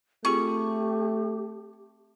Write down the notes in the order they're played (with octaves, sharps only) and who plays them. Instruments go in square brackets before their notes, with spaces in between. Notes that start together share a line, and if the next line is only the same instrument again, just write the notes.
[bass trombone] A3 [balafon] C4 F4 G#4 [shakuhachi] G4 [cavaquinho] C#6